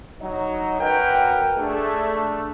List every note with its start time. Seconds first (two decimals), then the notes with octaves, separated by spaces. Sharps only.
0.21 F#3 D#4 D#5
0.80 F#2 F#4 A#4 B4 G5
1.58 A3 D4 G#4